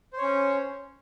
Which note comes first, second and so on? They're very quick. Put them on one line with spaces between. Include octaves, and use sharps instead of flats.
C5 C#5 C#4